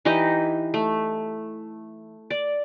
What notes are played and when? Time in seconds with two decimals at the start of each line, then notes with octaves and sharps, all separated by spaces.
0.05 E3 D#4 G4 D#5
0.74 A3
2.31 D5